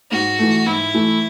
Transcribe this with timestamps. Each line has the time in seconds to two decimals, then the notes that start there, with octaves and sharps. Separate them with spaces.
0.11 G#2 F#4
0.39 E3 A3
0.66 G#2 E4
0.94 E3 A3